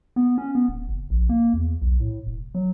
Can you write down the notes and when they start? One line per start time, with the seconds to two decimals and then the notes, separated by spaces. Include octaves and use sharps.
0.16 B3
0.38 C#4
0.55 B3
0.68 D1
0.89 F#1
1.10 A#1
1.29 A#3
1.54 E2
1.82 B1
2.00 A2
2.27 E1
2.55 F#3